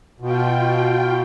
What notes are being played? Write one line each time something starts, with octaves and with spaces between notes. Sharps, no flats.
B2 F4 G5